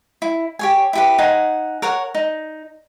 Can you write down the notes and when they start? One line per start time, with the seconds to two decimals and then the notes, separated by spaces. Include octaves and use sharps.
0.22 E4
0.59 G4 C#5 G#5
0.93 E4 G4 B4
1.18 D#4 F#5 G#5
1.82 A#4 C#5 F#5
2.15 D#4